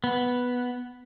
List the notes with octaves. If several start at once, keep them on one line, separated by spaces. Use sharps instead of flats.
B3